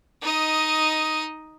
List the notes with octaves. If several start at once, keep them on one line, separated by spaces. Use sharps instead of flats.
D#4 D#5